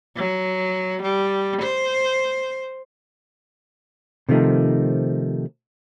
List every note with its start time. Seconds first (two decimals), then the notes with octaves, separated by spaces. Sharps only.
0.16 F#3
1.02 G3
1.62 C5
4.29 C3 D#3 F3 A3 D#4